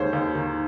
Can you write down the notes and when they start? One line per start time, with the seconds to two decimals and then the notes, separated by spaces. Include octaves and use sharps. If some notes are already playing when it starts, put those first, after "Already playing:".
Already playing: D#2 D#3 G#3 C5 C#5
0.13 D#2
0.35 D#3